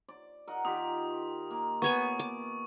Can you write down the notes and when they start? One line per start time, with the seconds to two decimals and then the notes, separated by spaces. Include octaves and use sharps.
0.09 D5
0.48 A#4 D#5 F#5
0.65 D#3 F4 G4 D#6
1.51 A#3
1.82 B3 C#5 G#5 C#6
2.19 D6